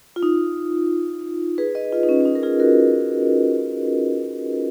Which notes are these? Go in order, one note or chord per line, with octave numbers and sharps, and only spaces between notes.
F4
D#4
G#4 B4
B4 D#5
F4
D#4
C#4
C#4
D#4
A#4
F4 G#4
F#4 A#4